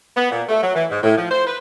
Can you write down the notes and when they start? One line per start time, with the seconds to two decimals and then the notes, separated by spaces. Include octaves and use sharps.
0.16 B3
0.31 A#2
0.49 A3
0.62 F#3
0.75 E3
0.90 G#2
1.03 A2
1.17 F3
1.30 C5
1.47 B4